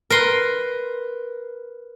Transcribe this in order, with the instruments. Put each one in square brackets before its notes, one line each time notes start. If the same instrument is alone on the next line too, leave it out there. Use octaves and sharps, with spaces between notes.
[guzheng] A#4 B4 C6